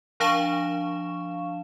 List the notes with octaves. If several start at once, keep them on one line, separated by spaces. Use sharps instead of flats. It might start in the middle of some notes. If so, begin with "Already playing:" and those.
F3 D4 F5 A5 C#6 E7